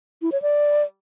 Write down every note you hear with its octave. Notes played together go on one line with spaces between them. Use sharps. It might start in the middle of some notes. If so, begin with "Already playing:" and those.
E4
C#5
D5